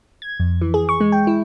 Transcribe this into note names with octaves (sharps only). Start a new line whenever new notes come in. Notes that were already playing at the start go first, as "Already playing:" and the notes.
G#6
F2
E3
G#4
C#6
G#3
G5
E4